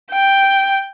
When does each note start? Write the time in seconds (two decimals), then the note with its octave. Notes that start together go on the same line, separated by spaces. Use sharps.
0.12 G5